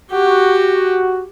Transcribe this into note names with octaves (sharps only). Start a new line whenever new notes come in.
F#4 G4